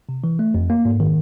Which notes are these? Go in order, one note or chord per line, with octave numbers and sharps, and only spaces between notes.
C3
E3
A3
F2
A#3
G#2
D#3